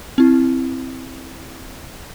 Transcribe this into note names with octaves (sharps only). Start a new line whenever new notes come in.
C4 E4